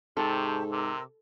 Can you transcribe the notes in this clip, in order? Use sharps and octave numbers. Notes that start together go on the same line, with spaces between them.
G#2 C3 G4 A4 A5 C#6
C3 A#4 D6 E6